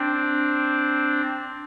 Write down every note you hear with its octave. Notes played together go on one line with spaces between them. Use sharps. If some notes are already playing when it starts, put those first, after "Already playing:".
Already playing: C4 D4